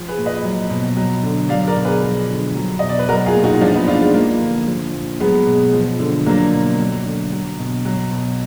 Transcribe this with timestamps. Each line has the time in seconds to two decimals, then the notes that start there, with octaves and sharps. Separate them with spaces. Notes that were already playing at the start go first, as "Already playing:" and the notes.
Already playing: F3
0.08 G#4 B4
0.17 A#2
0.26 B4 D#5
0.44 F#3
0.70 B2
0.97 F#3
1.23 D3
1.49 F#3 D5 F5
1.67 A#4 D5
1.76 B2
1.85 G#4 B4
2.03 F3
2.29 D3
2.55 F#3
2.79 B2 D#5
2.89 D5
2.99 B4
3.09 F#3 F#4 A#4
3.26 F4 G#4
3.35 A#2
3.44 D#4 F#4
3.61 F3 D4 F4
3.74 B3 D#4
3.88 A#2 D4 F4
4.01 G#3
4.14 F3 A#3
4.41 D3
4.67 F3
4.94 A#2
5.20 F#3 G#3 B3
5.47 B2
5.73 F3
6.00 D3
6.26 F#3 A#3 D4
6.53 B2
6.79 F#3
7.06 D3
7.32 F#3
7.59 B2
7.85 F#3
8.12 B2